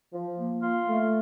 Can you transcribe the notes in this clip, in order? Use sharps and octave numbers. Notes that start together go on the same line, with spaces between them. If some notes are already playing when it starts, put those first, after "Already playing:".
F3
A#3
F4
A3